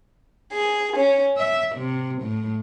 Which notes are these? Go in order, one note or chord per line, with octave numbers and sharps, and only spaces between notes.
G#4
C#4
E5
C3
A2